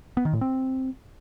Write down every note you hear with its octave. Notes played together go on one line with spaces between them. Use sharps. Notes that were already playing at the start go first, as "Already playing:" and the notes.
B3
D#3
A2
C4